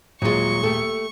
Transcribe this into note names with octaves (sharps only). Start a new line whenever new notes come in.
D#1 F#3 G#3 F4 C#6
A3 G4 A4